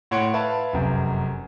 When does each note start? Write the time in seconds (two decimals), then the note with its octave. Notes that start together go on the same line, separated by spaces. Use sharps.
0.11 A2 C#5 F#5 C6 D7
0.34 B4 E5 F5 A5
0.73 F1 F#2